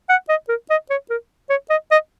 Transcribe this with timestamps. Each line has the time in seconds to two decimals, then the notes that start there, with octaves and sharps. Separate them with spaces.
0.09 F#5
0.29 D#5
0.49 A#4
0.70 D#5
0.90 C#5
1.10 A#4
1.50 C#5
1.70 D#5
1.91 D#5